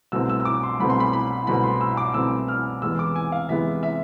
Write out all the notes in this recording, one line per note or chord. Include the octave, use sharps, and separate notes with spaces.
C2 B2 A3 C4 E6
E6
E6
D6
C6
C2 B2 A3 C4 B5
C6
B5
B5
C2 B2 A3 C4 B5
C6
E6
D6
C2 B2 A3 C4 E6
F6
E2 C3 G#3 B3 E6
D6
G#5
F5
E2 C3 G#3 B3 E5
E5